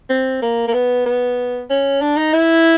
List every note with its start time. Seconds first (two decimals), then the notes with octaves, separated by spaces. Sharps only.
0.10 C4
0.42 A#3
0.68 A#3
0.73 B3
1.06 B3
1.70 C#4
2.01 D4
2.17 D#4
2.34 E4